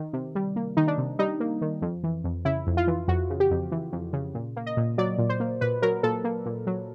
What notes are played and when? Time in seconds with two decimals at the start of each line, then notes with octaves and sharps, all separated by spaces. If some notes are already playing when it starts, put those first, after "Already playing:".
Already playing: D#3
0.13 C3
0.35 G3
0.56 A#3
0.77 D#3 D#4
0.88 D4
0.98 C3
1.19 G3 D#4
1.40 A#3
1.62 D#3
1.82 F2
2.03 E3
2.24 F2
2.45 C#3 E4
2.67 F2
2.77 F4
2.87 E3
3.08 F2 F#4
3.30 C#3
3.40 G4
3.51 F2
3.72 E3
3.92 F2
4.13 C#3
4.34 A#2
4.56 A#3
4.66 D#5
4.77 A#2
4.98 F#3 D5
5.18 A#2
5.29 C5
5.40 A#3
5.61 A#2 B4
5.82 F#3 A#4
6.03 A#2 A4
6.24 A#3
6.46 A#2
6.67 F#3